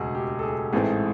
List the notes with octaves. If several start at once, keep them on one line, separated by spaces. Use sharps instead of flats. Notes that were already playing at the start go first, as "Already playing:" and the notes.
Already playing: E1 D2 C#3 F#4 G#4
G4
A4
G#4
A1 G#2 E3 A3 C4 G#4